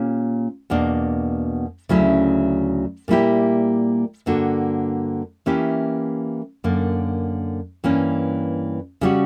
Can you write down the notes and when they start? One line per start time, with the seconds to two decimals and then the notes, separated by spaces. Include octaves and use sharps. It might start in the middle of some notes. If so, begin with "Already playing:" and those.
Already playing: A#2 A#3 C#4 G4
0.70 E2 B2 A#3 D4
1.89 D2 C#3 F#3 C#4 E4
3.08 A#2 G3 A#3 E4 G4
4.26 G2 D3 A#3 D4 F#4
5.46 E3 A#3 C#4 E4 G4
6.64 F#2 D3 A#3
7.84 G2 E3 A#3 C#4
9.01 C#3 G3 C#4 F#4